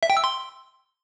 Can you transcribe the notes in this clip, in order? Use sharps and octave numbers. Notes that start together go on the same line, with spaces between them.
E5
G5
E6
C6